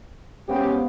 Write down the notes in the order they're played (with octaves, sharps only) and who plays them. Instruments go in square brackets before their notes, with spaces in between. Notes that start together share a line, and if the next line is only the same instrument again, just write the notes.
[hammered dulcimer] G#2 B3 F5 [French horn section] C#4 G4